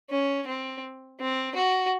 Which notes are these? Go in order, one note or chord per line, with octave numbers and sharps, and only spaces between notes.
C#4
C4
C4
F#4